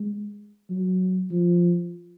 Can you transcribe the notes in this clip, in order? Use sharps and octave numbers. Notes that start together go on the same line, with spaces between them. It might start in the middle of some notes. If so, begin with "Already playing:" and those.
Already playing: G#3
F#3
F3